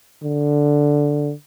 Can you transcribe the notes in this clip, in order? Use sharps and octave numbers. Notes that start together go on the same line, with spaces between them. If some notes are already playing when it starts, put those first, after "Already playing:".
D3